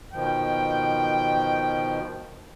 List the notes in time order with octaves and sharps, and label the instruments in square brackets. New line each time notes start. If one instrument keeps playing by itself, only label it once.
[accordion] B2 D#3 F3 [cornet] G5